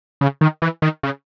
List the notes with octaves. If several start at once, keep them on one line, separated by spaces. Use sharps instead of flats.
C#3
D#3
E3
D#3
C#3